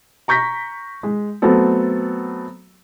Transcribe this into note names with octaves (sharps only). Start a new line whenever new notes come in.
A#5 C#6 G6 A#6 B6
G#3
F#3 A3 B3 C4 A4